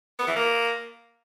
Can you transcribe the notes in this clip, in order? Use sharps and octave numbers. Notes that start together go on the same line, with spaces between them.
B3
E3
A#3